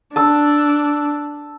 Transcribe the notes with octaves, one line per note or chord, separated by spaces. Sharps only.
D4 A5 E6